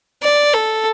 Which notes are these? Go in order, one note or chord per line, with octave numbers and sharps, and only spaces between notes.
D5
A4